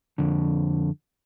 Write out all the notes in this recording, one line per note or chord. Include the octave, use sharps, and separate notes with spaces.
F2 D3